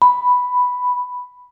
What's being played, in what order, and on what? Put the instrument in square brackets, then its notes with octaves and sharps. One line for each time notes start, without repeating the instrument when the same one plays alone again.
[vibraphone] B5